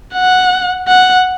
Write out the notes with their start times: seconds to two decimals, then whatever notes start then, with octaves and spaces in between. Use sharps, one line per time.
0.14 F#5
0.88 F#5